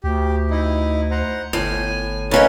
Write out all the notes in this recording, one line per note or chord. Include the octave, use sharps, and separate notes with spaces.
D2 G4
D#4 E4
C5 F#5 A#5
G1 A2 G#5
C#3 C#4 D#4 A#4 B4 C#5